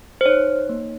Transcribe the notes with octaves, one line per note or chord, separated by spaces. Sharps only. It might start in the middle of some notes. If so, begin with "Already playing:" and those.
C5
D#4 C#5
A#3